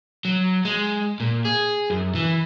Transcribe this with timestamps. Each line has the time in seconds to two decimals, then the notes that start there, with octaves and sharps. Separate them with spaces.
0.25 F#3
0.65 G#3
1.20 A#2
1.45 G#4
1.90 F#2
2.15 E3